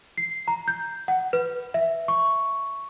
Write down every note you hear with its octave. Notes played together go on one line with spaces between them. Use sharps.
C7
A#5
G6
F#5
B4
E5
C#6